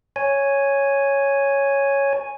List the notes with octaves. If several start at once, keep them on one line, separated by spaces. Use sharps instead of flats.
C#5 G#5